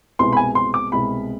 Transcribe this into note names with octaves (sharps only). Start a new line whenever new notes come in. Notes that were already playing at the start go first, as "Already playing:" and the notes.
C2 B2 G#3 C6
B5
G#5
C6
D6
C2 B2 G#3 B5